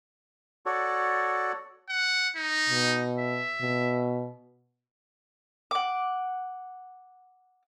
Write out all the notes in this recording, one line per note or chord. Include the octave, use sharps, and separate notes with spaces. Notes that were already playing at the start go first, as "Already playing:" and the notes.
F#4 A4 C#5 D5
F#5
D#4
B2
E5
B2
F#5 D6